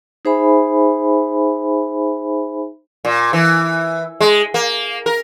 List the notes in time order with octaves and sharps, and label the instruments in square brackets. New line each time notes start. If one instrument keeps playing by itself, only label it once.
[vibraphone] D#4 G#4 C5 E5 G#5 B5
[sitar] A#2
E3
G#3
A#3
A#4